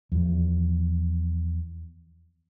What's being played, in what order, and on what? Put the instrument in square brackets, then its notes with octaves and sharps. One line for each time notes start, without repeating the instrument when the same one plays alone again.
[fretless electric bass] E2 F3